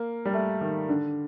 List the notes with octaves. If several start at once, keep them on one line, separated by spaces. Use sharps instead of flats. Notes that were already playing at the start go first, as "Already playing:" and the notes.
Already playing: A#3
G3
A3
D#3
D3